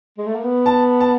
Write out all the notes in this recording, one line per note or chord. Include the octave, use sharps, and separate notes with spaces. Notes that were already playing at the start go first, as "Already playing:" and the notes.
G#3
A3
A#3
B3
A5
A5